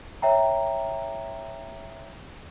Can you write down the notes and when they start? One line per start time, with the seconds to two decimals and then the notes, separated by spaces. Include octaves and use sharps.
0.22 C#5 E5 G5 A#5